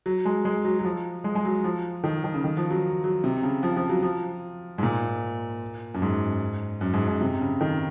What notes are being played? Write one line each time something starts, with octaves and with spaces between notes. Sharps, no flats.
F#3
G#3
G#3
F#3
F#3
F3
G#3
G#3
F#3
F3
D#3
D#3
C#3
D#3
F3
F#3
F#3
C3
C#3
F3
F3
F#3
F3
G#2
A#2
F#2
G#2
F#2
G#2
G#2
C3
C#3
D#3